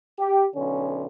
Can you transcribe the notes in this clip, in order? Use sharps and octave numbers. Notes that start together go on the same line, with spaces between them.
G4
B1 D3 C#4